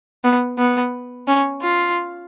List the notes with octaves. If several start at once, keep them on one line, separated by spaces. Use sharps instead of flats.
B3
B3
C#4
F4